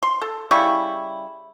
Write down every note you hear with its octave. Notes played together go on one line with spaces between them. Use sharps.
C6
A4
C#3 G3 E4 C#6